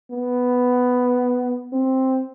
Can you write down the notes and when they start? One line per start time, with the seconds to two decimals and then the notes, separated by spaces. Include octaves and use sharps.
0.10 B3
1.73 C4